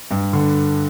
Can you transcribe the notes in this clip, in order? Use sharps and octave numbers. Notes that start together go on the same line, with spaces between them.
G2
D3